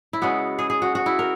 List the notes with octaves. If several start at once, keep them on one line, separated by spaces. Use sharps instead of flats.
E4
C#3 G#3 B3 F#4
G#4
G#4
F#4
F#4
E4
A#4